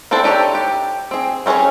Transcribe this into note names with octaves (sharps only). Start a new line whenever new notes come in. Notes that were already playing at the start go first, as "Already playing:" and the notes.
C4 D4 E4 A4 C5
D4 D#4 G4 A4 C#5
G4
C4 G#4
C4 C#4 F4 G#4 C#5